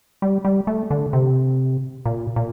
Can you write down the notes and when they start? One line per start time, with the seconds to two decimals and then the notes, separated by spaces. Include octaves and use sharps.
0.22 G3
0.45 G3
0.67 A3
0.91 D3
1.13 C3
2.06 A#2
2.36 A#2